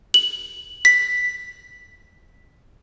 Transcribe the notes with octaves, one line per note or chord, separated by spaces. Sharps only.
F#7
B6